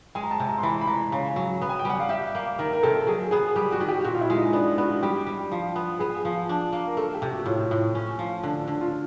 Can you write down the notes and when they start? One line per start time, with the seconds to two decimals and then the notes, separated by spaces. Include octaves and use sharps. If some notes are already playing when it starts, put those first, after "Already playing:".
0.15 G#3 G#5
0.23 A#5
0.31 A5
0.40 C3
0.47 A#5
0.58 C6
0.63 E3 B5
0.81 B5
0.87 E3 A#5
1.12 C#3
1.36 F#3
1.62 B3
1.69 G#5
1.79 G5
1.85 G3 F#5
2.00 F5
2.09 G4 E5
2.35 A#3
2.59 D#3 A#4
2.73 A#4
2.83 C3 A4
3.07 F#3 G#4
3.31 B3 G#4
3.56 G3 G4
3.72 F#4
3.80 D#3
3.88 G4
4.04 A#2 F#4
4.15 F4
4.21 E4
4.30 G#3
4.37 D#4
4.53 B3 D4
4.78 B3 F#4
5.02 G3 G4
5.27 G3
5.52 F3
5.76 B3
5.99 B3 G#4
6.25 F3
6.49 D4
6.73 A#3
6.87 A#4
6.97 A3 A4
7.14 G4
7.22 C3
7.30 F#4
7.46 A2 F4
7.71 A2
7.95 C#4
8.19 F3
8.43 D3
8.68 D3
8.81 F4